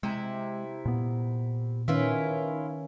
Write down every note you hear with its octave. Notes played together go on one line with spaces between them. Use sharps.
C3 G#3 E4 A#5
A#2 B3
D#3 C#4 E4 F4 B4